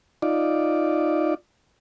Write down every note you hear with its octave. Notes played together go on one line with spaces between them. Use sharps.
D#4 F4 D5